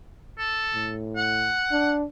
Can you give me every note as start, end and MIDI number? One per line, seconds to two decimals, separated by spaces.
0.38 0.92 69
0.74 1.53 45
1.16 1.93 78
1.72 2.05 62